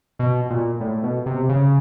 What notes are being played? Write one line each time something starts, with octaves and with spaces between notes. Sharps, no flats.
B2
A#2
A2
B2
C3
C#3